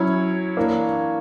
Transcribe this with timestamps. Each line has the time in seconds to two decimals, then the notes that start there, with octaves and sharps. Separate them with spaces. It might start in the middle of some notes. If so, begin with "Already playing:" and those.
Already playing: F#3 C#4 E4 C#5
0.57 E3 A#3 D4